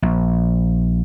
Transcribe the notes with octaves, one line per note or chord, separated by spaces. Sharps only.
A#1